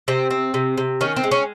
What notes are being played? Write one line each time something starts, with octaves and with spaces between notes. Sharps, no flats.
C3 C4
C4
C3
C3
D#3 C#4
C4
G#3
C#4